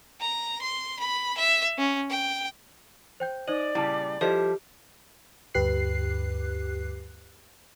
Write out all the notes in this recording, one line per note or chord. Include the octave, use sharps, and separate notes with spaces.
A#5
C6
B5
E5
C#4
G5
C5 G5 G6
D#4 C5 D5 D#5 F#7
A#2 C#3 G3 E4 A5
F3 G3 E4 G4 A4 C5 D#5
D2 G2 G4 B4 F#6 C7